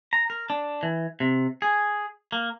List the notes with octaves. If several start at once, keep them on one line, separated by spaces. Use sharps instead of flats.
A#5
A#4
D4
E3
C3
G#4
A#3